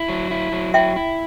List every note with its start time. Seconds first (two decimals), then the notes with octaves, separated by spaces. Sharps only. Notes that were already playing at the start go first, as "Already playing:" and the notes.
Already playing: E4
0.08 F#3
0.31 E4
0.52 F#3
0.74 E4 E5 G5
0.96 E4